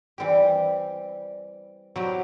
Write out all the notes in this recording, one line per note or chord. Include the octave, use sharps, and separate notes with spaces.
E3 G3 C4 G4
F#3 C4 E4 G4